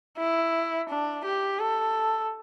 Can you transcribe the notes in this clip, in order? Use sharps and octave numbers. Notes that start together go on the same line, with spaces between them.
E4
D4
G4
A4